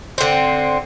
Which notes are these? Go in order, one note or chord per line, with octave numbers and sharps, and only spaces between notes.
D3 C4